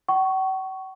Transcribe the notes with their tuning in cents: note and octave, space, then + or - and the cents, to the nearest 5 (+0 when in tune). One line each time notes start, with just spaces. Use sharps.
F#5 +45 C#6 +0